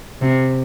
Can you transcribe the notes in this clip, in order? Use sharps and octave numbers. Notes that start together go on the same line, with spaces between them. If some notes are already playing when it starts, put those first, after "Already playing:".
C3